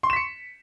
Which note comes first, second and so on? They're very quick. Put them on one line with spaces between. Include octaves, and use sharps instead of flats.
C6 C#6 E7 B6 C#7